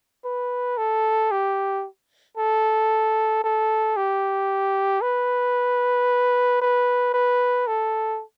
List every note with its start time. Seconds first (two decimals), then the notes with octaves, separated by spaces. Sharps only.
0.25 B4
0.78 A4
1.31 G4
2.38 A4
3.44 A4
3.97 G4
5.02 B4
6.62 B4
7.14 B4
7.67 A4